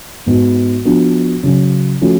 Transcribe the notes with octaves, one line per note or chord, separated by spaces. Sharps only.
G#2 G#3 B3 F#4
F3 B3 D4 F#4
C#3 F#3 C#4
F3 A3 C#4 F#4